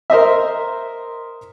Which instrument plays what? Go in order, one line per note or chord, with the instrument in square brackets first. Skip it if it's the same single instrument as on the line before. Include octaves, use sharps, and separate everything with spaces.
[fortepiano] A#4 C5 D#5 E5